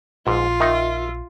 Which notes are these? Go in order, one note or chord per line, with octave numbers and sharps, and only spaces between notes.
A#1 G#2 F4
D#3 D#4 E5